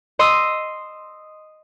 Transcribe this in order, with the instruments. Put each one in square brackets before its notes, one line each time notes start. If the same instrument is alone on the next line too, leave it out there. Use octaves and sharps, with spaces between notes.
[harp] D#5 C6 D#6 E6